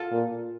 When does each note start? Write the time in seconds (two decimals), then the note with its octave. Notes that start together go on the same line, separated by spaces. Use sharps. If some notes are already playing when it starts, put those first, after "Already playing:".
Already playing: F4 A4
0.11 A#2